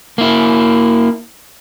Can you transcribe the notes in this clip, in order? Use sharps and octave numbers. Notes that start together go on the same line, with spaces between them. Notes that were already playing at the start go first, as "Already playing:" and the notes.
A#3 E4